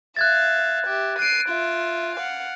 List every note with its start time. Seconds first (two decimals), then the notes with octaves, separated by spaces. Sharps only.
0.17 E5 F5 F#6 G#6 A6
0.86 G4 E5
1.19 F#6 C7 D7 D#7
1.49 F4 E5
2.16 F5 F#5